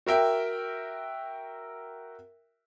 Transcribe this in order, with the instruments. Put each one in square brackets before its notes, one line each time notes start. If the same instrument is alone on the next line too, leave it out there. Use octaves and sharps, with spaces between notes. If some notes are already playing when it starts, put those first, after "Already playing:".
[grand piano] F#4 A#4 E5 G5